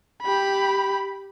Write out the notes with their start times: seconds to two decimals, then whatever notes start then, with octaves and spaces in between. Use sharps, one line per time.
0.22 G4 B5